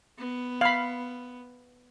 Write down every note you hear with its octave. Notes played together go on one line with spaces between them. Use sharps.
B3
F5 B5